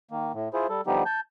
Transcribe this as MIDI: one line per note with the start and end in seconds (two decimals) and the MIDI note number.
0.11 0.32 51
0.11 0.32 58
0.34 0.49 45
0.54 0.67 64
0.54 0.67 65
0.54 0.67 68
0.54 0.67 72
0.69 0.81 55
0.69 0.81 69
0.87 1.03 50
0.87 1.03 53
0.87 1.03 55
0.87 1.03 59
0.87 1.03 63
0.87 1.03 67
1.06 1.20 81
1.06 1.20 91